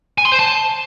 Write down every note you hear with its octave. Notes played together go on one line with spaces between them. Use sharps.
G#5
C6
C5
A5